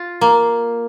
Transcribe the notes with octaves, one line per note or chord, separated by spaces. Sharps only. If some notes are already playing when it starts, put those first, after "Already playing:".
Already playing: F4
A#3